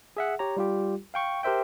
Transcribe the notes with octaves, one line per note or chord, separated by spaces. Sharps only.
G#4 E5 F#5
G4 C#5 A#5
G3 F4 G4
F5 G5 C#6
G4 A#4 C5 E5 G5